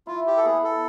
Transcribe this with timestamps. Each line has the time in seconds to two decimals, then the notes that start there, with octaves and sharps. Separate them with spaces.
0.07 E4 F4
0.27 G4
0.37 A4
0.45 B3 G#4
0.64 A4